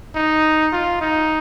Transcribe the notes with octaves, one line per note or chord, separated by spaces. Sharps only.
D#4
F4
D#4